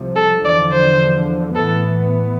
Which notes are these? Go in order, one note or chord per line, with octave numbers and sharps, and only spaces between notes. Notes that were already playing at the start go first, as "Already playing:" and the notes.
Already playing: C2 C3 F3
A4
E2 D3 F3 D5
C5
A2 E3 B3 A4